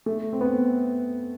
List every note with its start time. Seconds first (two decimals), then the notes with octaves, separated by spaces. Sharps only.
0.06 A3
0.33 C4
0.41 B3